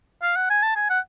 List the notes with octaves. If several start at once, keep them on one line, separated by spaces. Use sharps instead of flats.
F5
F#5
G#5
A5
G#5
F#5